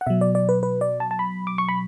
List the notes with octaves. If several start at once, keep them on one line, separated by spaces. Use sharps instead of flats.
F#5
B2 F#3 E5
D5
D5
B4
B4
D5
A5
A5
B5
D6
C#6
B5